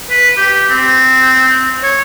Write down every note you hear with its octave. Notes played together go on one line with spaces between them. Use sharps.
B4
G4
C4
C#5